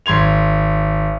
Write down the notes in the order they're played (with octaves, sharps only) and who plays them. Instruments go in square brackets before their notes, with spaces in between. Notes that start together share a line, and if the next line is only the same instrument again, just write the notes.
[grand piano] G#1 C6 G#6 F7